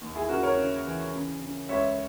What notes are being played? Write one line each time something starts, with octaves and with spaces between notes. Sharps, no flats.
D#2
E4 G#4
C#3 F#4 A#4
A#4 C#5
C#3
E3
C#3
C#3
C#2 C#5 E5